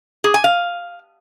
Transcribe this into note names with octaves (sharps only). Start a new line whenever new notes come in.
G#4
G#5
F5